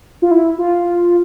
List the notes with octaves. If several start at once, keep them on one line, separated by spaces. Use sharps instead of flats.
F4
E4
F4